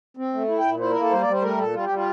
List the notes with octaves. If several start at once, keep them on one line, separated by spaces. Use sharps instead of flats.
C4
A3
E4
G5
A#2
E4 C5
A#4
A#3
A4
G3 C5
D5
G3
C5
A3 A#4
A#2 A4
G3 F4
G4
G3
F4